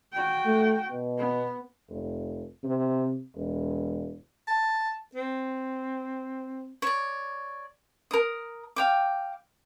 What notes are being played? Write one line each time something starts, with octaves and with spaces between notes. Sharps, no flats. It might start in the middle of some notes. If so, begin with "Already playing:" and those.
F#4 G5
A3
B2
B3
F1
C3
E1
A5
C4
C#5 D5
A#4 D#6
F5 G5 D6